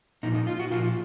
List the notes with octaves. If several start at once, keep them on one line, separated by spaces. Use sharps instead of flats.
A#2 F3 D#4
D#4
F4
F#4
A#2 F3 F4